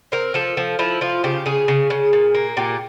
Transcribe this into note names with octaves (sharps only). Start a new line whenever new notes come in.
C4 A#4
F3 A4
F3
F3 E4
F3 F4
C#3 G4
C#3 G#4
C#3
C#3
A#2
A#3
A#2 G4